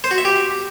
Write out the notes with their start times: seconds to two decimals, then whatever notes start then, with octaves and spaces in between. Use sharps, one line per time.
0.04 C5
0.11 F#4
0.18 E5
0.25 G4